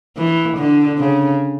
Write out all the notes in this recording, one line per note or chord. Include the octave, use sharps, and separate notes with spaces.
E3
D3
C#3